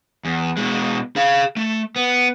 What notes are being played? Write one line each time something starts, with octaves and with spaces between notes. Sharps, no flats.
E2
B2 G#3
G#4 F5
A3
B3